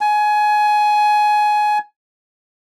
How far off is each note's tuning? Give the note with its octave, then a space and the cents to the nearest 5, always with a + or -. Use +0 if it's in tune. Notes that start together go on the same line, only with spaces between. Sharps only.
G#5 +20